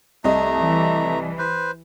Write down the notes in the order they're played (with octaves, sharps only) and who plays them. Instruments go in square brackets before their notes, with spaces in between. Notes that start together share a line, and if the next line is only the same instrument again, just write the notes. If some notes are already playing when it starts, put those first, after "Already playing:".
[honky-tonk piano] C2 D#5 [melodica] A3 A#5
[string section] E3
[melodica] B4 C5